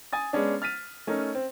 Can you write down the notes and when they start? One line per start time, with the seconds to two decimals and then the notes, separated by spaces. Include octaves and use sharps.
0.13 G#5 D#6 A6
0.33 G#3 B3 C#4 D4
0.62 F6 A6 B6 D#7
1.07 A3 C#4 D#4 A#4
1.35 C4